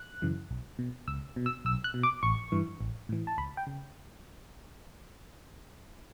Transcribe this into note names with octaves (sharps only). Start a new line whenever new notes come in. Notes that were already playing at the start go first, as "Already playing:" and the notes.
Already playing: F#6
F#2 C#3 E3
B1
B2
C#2 E6
B2
E6
B1 E6
F#6
B2
D6
A1 C#6
G2 E3
A1
A2 E3
A5
C#2 B5
G5
C#3